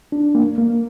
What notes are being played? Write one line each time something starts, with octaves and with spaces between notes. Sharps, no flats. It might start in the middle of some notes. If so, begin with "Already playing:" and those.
D4
A#3
A#3